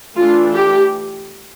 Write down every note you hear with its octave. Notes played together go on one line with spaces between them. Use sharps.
E3 A3 D4 F4
G4